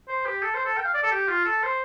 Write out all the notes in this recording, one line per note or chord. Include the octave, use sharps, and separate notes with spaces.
C5
G4
A4
C5
A4
G5
F5
D5
A4
G4
F4
A4
C5